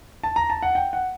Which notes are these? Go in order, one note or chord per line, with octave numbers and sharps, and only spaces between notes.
A5
A#5
A5
F#5
G5
F#5